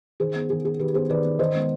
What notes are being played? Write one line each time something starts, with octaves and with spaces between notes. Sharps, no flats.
D#3 G#4 C5
B3
D#3 G#4
B3 G#4
D#3 G4 B4
B3 G#4 C5
D#3 B4 D5
B3
D#3 C5 D#5
G#3 B3